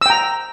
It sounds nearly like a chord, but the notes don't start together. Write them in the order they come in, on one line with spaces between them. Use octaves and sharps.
E6 G5 A#5